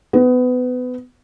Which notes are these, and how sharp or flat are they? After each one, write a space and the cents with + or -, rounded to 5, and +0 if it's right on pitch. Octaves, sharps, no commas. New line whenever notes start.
B3 +25